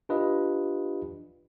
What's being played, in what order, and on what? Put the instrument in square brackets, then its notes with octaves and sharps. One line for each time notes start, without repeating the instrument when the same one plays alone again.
[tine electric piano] D4 F4 G4 B4 D#5